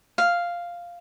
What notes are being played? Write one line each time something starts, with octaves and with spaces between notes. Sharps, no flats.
F5